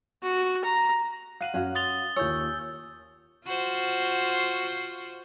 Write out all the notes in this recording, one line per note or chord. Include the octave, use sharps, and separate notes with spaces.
F#4
A#5
F5 F#5 F#6 D#7 F#7
F#2 C#4 F#4 F5
C6 D#6 A6 F7 G7
D#2 F4 C#5 G#5 E6 G6
F4 F#4 C5